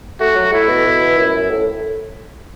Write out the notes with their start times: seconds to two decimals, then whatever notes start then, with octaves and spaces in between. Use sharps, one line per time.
0.20 A3 F#4
0.36 F#3
0.53 A3 E4
0.68 B2
0.86 B2
1.18 F#2
1.51 A2